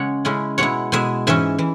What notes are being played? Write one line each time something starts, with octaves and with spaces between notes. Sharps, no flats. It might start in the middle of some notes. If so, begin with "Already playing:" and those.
Already playing: C#3 G#3 C#5 F#5
C#3 G#3 C#4 E4
B2 G#3 E4 C#5 F#5
B2 G#3 E4 E5 G#5
G#2 E3 C#4 E5 G#5
E3